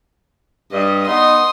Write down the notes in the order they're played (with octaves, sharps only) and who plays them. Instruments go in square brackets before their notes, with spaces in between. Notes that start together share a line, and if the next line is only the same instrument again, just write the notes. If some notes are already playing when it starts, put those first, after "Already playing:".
[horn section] G2 [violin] D#5
[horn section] B3 D#4 [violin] C6 D#6